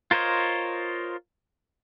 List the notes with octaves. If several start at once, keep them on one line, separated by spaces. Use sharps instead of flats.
F4 A#4 C5 C#5 D#5